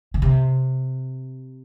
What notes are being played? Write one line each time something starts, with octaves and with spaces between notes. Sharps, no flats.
D3
C3